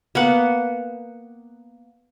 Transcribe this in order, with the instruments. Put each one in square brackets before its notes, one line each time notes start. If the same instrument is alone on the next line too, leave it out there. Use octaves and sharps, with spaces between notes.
[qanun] A#3 B3 F#5